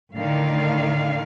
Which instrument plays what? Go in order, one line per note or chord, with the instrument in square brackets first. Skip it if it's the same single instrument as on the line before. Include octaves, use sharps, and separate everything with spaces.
[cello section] A2 D3 D#3 F5